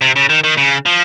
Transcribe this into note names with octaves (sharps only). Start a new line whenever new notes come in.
C3
C#3
D#3
D#3
C#3
F3